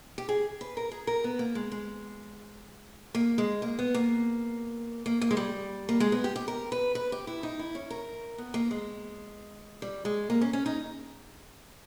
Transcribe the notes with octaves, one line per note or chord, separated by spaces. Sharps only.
G4
G#4
B4
A#4
G#4
A#4
B3
A#3
G#3
G#3
A#3
G#3
A#3
B3
A#3
A#3
A#3
G#3
G3
A#3
G#3
B3
G4
G4
A#4
B4
B4
G4
E4
D#4
E4
C#4
A#4
B3
A#3
G#3
G3
G#3
A#3
C#4
C#4
D#4